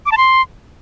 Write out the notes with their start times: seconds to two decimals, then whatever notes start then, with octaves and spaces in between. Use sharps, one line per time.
0.06 D6
0.12 A5
0.17 C6